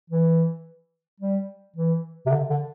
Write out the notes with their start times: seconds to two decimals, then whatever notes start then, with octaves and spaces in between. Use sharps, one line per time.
0.10 E3
1.20 G3
1.76 E3
2.26 C3
2.32 D3
2.50 D3